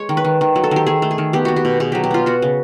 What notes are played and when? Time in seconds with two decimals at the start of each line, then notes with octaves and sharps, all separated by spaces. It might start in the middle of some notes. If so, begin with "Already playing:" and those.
Already playing: G#3 C#5
0.09 D#3
0.17 B4
0.25 D#3
0.41 D#3
0.56 F#3
0.64 A4
0.71 D#3 G4
0.86 D#3 G#4
1.02 A3
1.11 G#4
1.18 D#3
1.33 B3 G4
1.45 B3 F#4
1.56 G4
1.65 B2
1.80 B2 G#4
1.92 F#3 G4
2.04 G4
2.11 B3 F4
2.26 B3 F#4
2.42 C#3